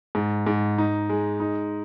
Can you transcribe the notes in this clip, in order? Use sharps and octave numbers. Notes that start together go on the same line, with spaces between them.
G#2
G#2
D#4
G#3
D#4